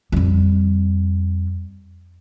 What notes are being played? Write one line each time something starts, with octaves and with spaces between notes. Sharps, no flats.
F2 G3